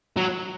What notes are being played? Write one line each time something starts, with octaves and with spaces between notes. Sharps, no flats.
F#3